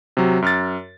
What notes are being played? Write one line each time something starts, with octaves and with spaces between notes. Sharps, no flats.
C3 F#3
F#2 F6 A6